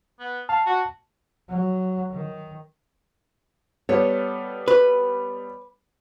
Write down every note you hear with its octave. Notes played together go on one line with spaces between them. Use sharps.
B3
F5 A5
F#4
F#3
D#3
G3 B3 A4 C#5
B4